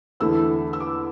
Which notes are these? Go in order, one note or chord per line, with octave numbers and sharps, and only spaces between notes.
E2 D3 A3 E4 E6
E6
D6